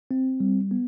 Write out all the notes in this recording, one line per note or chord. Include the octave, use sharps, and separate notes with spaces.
C4
G3
B3